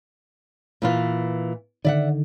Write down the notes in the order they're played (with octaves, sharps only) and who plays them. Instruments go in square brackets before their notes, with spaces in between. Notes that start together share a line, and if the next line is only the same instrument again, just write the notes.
[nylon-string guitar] A#2 E3 F4
[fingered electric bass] D3 D#3 [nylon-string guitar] D5 E5 F#5